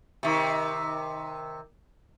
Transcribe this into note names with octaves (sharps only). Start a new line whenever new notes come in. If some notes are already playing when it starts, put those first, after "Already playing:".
C3 D#3